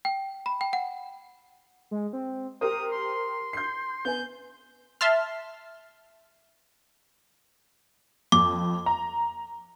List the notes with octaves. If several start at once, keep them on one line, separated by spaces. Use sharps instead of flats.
G5
B5
G5
F#5
G#3
C4
G4 A#4 C5 D#6
C6
G6 C7
B3 G#5 G6
E5 A5 C6 F6
F2 D6
A#5